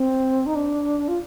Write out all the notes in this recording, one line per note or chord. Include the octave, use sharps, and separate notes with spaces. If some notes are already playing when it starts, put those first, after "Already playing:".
Already playing: C4
D#4
D4
F4